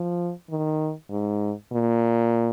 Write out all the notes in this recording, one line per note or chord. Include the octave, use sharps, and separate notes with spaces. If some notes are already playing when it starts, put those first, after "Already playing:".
Already playing: F3
D#3
G#2
A#2